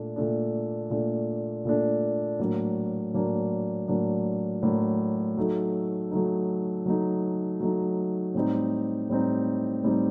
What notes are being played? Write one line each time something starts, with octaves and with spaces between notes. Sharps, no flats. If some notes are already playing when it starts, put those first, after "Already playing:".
Already playing: A#2 A3 D4
A#2 A3 D4
A#2 A3 D4
A#2 A3 D4
A2 F#3 A#3 D4
A2 F#3 A#3 D4
A2 F#3 A#3 D4
A2 F#3 A#3 D4
F#3 A3 D#4
F#3 A3 D#4
F#3 A3 D#4
F#3 A3 D#4
A2 G3 C4 D#4
A2 G3 C4 D#4
A2 G3 C4 D#4